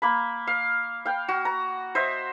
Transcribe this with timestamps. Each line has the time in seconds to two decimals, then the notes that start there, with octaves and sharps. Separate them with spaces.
0.02 A#3 B5
0.47 F5
1.06 F5 G5
1.28 F#4
1.45 A#5
1.95 C5 D#5 E5